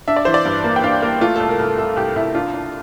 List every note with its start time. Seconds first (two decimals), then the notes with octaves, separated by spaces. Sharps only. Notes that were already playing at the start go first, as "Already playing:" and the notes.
0.08 D4 E5
0.16 D5
0.25 E3 C5
0.34 D5
0.45 G2
0.64 A#3
0.76 G5
0.83 D4 F5
1.02 A#3 A#4
1.21 A3 F4
1.36 C2 A4
1.49 A#4
1.59 C2 A4
1.78 C2 A4
1.97 C2 G4
2.16 C2 E4
2.35 D4 F4
2.54 D4